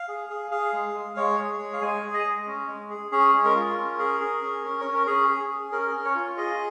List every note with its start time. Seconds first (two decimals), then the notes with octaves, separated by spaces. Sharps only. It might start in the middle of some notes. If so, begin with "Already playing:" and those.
Already playing: F5
0.08 G#4
0.30 G#4
0.51 G#4 F5
0.73 G#3
0.94 G#3
1.16 G#3 C#5
1.38 G#4
1.59 G#3
1.73 F5
1.82 G#3 G#5
2.03 G#4
2.14 D#5
2.25 G#3
2.47 C#4
2.68 G#3
2.90 G#4
3.12 C#4 G#4
3.34 G#3
3.45 A#4
3.55 F4
3.77 C#4
3.99 G#4
4.20 G#4
4.42 C#4
4.64 C#4
4.81 C#4 C#5
4.94 A#4
5.07 C#4 G#4
5.29 G#4
5.50 G#4
5.72 C#4 A#4
5.94 C#4
6.05 C#5
6.15 F4
6.37 G#4 D#5